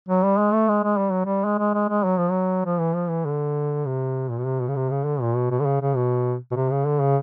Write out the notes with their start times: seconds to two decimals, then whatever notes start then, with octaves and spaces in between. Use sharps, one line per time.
0.09 F#3
0.24 G3
0.38 G#3
0.53 A3
0.69 G#3
0.84 G#3
0.98 G3
1.12 F#3
1.26 G3
1.45 G#3
1.59 G#3
1.74 G#3
1.89 G#3
2.05 F#3
2.18 F3
2.31 F#3
2.65 F3
2.80 E3
2.95 F3
3.09 E3
3.25 D3
3.86 C3
4.30 A#2
4.38 B2
4.45 C3
4.60 B2
4.68 C#3
4.76 C3
4.90 C#3
5.05 D3
5.21 A#2
5.36 B2
5.51 B2
5.60 D3
5.66 C#3
5.81 C#3
5.96 B2
6.51 B2
6.56 C3
6.71 C#3
6.86 D3
7.01 C#3